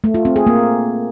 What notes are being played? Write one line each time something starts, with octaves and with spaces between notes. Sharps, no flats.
A3
F4
C4
G#4
A#3